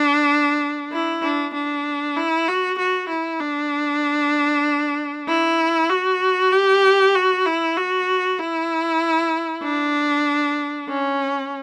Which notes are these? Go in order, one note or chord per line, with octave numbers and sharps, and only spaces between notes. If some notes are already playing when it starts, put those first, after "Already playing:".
Already playing: D4
E4
D4
D4
E4
F#4
F#4
E4
D4
E4
F#4
G4
F#4
E4
F#4
E4
D4
C#4